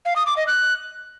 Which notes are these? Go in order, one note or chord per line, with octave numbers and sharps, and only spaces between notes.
F5
D#6
D6
D#5
F#6